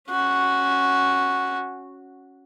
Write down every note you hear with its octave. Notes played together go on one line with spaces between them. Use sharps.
C#4 F#4